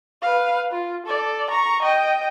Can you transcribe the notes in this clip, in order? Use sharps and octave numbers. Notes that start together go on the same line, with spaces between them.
B4 F5
F4
A4 D5
A#5 C#6
D#5 G5